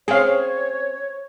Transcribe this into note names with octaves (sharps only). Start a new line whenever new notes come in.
C4 C#4 G#4 C#5 F5